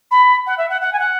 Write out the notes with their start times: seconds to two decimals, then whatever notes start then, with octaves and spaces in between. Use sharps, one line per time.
0.11 B5
0.47 F#5
0.58 E5
0.70 F#5
0.81 F#5
0.93 G#5
0.99 F#5